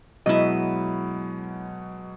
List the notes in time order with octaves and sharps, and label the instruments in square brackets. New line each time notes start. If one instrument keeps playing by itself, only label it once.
[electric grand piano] B2 F#3 G#3 [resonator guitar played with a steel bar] E4 D#5